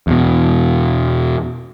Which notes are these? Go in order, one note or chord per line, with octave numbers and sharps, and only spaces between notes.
E2 B2